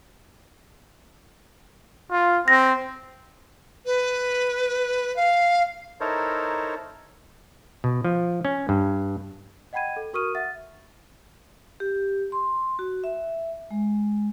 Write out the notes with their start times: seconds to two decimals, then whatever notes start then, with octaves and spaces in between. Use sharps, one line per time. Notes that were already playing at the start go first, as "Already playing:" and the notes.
2.11 F4
2.48 C4 A#6
3.86 B4
5.16 F5
6.00 D#4 E4 A4 A#4 C5 C#5
7.84 B2
8.04 F3
8.45 C#4
8.69 G2
9.73 D#5 F#5 G5 B5 G#6 D#7
9.96 A4
10.13 F#4 A#4 C#6 D#6 F6 D#7
10.35 E5 F#5 A6
11.80 G4
12.32 C6
12.79 F#4
13.04 E5
13.71 G#3